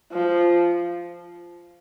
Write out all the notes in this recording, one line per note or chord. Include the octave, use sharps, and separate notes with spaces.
F3